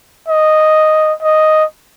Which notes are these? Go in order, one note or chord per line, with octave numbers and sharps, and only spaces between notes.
D#5
D#5